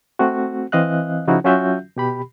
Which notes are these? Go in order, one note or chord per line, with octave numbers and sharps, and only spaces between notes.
A3 C4 F#4
E3 C4 D#5 F5 F#6
C#3 F3 C#4 D#4 E4 F#4
F#3 C#4 F4 F#4 E5 G6
B2 G4 B5